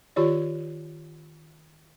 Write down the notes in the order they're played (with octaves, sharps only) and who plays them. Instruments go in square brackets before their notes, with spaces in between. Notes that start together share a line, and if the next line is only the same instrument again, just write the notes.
[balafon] D#3 F4 G4 C#5 D5